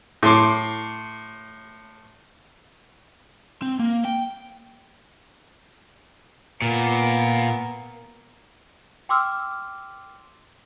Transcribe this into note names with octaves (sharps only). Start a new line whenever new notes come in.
A2 C6 D6
C4
A#3
G5
A#2 B3 A#4
G5 C6 D6 E6 F6